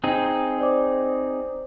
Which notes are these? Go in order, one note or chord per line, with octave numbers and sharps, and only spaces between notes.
C4 D#4 G#4
C5 D5 D6